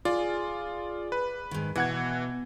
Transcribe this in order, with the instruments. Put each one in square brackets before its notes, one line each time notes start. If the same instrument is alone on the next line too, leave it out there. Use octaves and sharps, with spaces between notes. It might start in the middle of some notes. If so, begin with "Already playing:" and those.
[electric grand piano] F4 D5 [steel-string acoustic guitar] G#4
[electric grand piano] B4
[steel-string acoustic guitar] G#2 D#3
[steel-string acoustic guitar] B2 [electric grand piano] E3 F#5 G#6